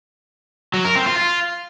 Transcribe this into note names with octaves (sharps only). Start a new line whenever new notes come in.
F#3
A#4
C4
F4
F4